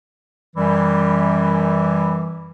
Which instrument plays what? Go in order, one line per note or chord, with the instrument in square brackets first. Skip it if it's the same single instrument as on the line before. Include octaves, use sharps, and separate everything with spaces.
[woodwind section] F#2 E3 G3